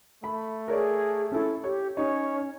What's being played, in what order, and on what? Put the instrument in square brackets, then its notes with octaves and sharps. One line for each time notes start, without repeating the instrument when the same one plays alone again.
[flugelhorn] A3 [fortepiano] B5
[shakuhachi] G#4 [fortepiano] A#4 C#5 D5
[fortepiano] C#4 E4 [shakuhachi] A4
[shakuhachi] G4 [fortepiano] C#5
[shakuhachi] C#4 [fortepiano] D#4 [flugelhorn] C#5